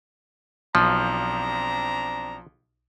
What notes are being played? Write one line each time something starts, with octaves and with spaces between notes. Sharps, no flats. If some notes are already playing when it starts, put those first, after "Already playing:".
B1 F3 C4 D4 A#5